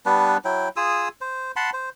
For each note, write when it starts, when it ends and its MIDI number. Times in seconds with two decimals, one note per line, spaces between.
0.06 0.37 55
0.06 0.37 59
0.06 0.37 62
0.06 0.37 71
0.45 0.69 54
0.45 0.69 64
0.45 0.69 79
0.76 1.09 65
0.76 1.09 68
0.76 1.09 87
0.76 1.09 88
1.21 1.52 72
1.56 1.70 78
1.56 1.70 81
1.56 1.70 83
1.56 1.70 84
1.73 1.90 72